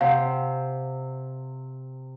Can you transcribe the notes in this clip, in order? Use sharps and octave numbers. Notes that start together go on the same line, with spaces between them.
C3 F5 F#5